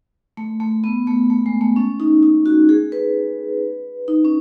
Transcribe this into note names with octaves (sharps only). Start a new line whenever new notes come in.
A3
A3
B3
A3
A3
G#3
A3
C#4
D#4
D#4
F#4
G#4
B4
D#4
C#4